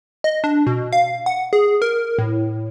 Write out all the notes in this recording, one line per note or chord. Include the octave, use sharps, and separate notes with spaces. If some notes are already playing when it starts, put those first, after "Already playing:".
D#5
D4
B2
F5
F#5
G#4
A#4
A2